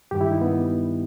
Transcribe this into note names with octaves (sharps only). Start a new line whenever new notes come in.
G2 D#3 G3 G4
E4
D#4
B3